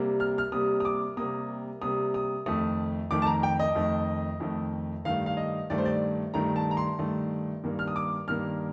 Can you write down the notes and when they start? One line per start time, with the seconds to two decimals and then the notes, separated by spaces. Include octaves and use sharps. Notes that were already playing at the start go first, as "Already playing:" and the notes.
Already playing: C3 G3 A#3
0.20 F6
0.38 F6
0.52 C3 G3 A#3 D#6
0.80 D#6
0.85 D6
1.17 C3 G3 A#3 D#6
1.82 C3 G3 A#3 D#6
2.14 D#6
2.46 F2 D#3 A3 D#6
3.11 F2 D#3 A3 D6
3.22 A5
3.27 A#5
3.43 G5
3.59 D#5
3.75 F2 D#3 A3
4.40 F2 D#3 A3
5.05 G2 D#3 A3 F5
5.26 F5
5.37 D#5
5.70 G2 D#3 A3 D5
5.78 C5
5.85 D5
6.34 G2 D#3 A3 A#5
6.56 A5
6.71 A#5
6.77 C6
6.99 G2 D#3 A3
7.63 G2 D#3 A#3
7.79 F6
7.88 D#6
7.96 D6
8.28 G2 D#3 A#3 F6